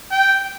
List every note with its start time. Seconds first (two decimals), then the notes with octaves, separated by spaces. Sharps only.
0.11 G5